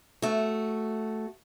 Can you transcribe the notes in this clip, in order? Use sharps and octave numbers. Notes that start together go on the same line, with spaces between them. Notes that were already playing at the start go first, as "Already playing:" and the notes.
A3 F#4